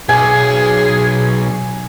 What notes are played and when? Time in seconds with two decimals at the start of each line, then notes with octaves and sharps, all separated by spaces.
0.09 B1 G#4 G#5